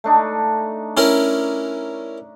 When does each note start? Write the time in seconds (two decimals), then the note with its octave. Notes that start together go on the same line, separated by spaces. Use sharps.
0.04 A3 D4 D#4
0.97 C#4 E4 A#4